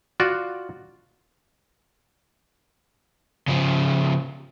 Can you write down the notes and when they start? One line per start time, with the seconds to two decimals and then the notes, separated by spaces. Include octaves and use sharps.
0.20 F4 F#4 D5
3.48 C#3 F3